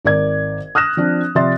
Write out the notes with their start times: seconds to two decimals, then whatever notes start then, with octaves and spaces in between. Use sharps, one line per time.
0.05 G#1 A#4 D5 G#6
0.75 D#6 F6 F#6 A#6 E7
0.97 F3 C4 D4
1.35 C3 F3 D5 E5 C6 A6